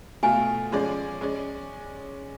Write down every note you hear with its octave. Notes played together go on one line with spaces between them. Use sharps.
B2 A3 F4 G#5
F3 G#3 C#4 G#4 D5
G#3 C#4 G#4 D5